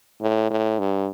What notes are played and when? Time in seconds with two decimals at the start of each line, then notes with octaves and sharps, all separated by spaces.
0.21 A2
0.51 A2
0.79 G2